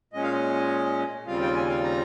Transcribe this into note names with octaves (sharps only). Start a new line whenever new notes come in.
A#2 G#3 C#4 D#5
F5
D#5
D#2 C#3 G3 C4 F4 F5
G5
G#5
F5
A#5